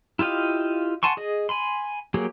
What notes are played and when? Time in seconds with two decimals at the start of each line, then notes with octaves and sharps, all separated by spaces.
0.19 E4 F4 G4 D#5 F5
1.03 F#5 G#5 A5 C6 C#6
1.17 G#4 D#5
1.49 G#5 B5 C6
2.14 F#3 A#3 G4 G#4